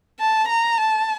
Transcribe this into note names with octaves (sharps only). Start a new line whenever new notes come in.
A5
A#5
A5